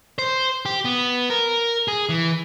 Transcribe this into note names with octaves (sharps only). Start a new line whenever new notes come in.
C5
G4
B3
A#4
G#4
E3